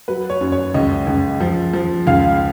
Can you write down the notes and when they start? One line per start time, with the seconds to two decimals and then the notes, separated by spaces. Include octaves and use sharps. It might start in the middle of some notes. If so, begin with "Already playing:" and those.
0.08 F#3 B4
0.30 C#5
0.41 F#2
0.52 C#5
0.74 C#2 D#5
1.07 C#2
1.40 F3
1.73 F3
2.07 C#2 F5